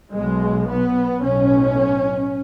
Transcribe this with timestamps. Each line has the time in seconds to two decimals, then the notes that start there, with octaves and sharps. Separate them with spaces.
0.13 B1 B2 G#3
0.67 B3
1.23 B1 A2 C#4